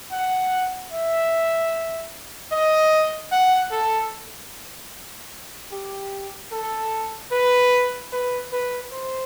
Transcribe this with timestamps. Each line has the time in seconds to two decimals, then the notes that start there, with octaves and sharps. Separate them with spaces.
0.12 F#5
0.92 E5
2.52 D#5
3.32 F#5
3.71 A4
5.72 G4
6.52 A4
7.32 B4
8.12 B4
8.52 B4
8.92 C5